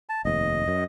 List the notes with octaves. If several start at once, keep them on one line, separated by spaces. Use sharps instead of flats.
A5
F1 D#2 D#5
F#2